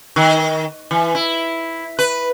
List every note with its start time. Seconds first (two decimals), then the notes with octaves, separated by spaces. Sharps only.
0.16 D#3
0.91 E3
1.15 E4
1.99 B4